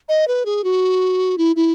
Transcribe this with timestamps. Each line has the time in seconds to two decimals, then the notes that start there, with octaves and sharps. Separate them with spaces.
0.09 D#5
0.28 B4
0.46 G#4
0.64 F#4
1.38 E4
1.56 E4